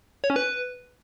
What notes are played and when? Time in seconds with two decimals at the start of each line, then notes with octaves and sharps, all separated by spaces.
0.24 C#5
0.30 C#4
0.36 B4